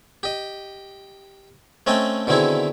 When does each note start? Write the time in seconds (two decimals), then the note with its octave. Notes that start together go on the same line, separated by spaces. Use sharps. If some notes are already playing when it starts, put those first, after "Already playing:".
0.23 G4 D#5
1.87 A3 C4 C#4 D#5 G5 A5
2.27 B2 D3 D#3 C4 E4 G#4